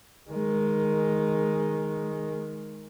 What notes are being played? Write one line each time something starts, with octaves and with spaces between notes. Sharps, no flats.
D#3 G#3